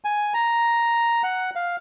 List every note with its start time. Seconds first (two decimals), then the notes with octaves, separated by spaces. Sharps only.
0.05 G#5
0.34 A#5
1.23 F#5
1.56 F5